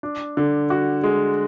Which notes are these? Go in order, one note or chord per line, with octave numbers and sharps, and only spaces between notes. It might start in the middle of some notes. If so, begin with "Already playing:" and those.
D4
D3
F#4
G#3